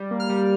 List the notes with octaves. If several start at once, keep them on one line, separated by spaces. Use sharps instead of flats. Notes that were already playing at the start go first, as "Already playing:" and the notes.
Already playing: G3
A#3
F6
G3